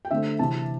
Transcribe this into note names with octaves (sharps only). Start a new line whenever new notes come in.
G5
D3 A3 C4 E5
C3 E3 C4 A5